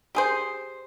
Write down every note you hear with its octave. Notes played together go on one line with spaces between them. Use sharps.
G4 G#4 C5